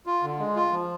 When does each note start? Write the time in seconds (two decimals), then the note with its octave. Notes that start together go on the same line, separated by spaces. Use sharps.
0.06 F4
0.23 D3
0.39 G#3
0.56 F4
0.72 F3